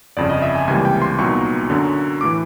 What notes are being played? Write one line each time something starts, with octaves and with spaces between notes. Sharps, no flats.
G1 F2 C#3 D5
D#5
E5
G#5
C#2 C3 E3 G3 A#3 G#5
G5
C6
C2 A#2 F#3 B3 D#4 C#6
F#2 D3 F#3
A2 E3 D6